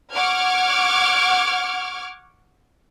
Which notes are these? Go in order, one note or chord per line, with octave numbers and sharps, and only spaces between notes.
F#5 C#6 D6 F6 G#6